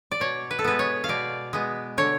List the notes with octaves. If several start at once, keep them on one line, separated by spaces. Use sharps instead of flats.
D5
B2 C#5
B4
A4
G#3 B3 B4
C#5
F5
B2 D5
G#3 B3
D3 C#5